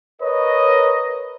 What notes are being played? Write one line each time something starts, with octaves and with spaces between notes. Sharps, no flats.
A#4 B4 C#5 D#5